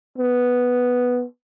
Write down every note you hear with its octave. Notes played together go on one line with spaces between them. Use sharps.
B3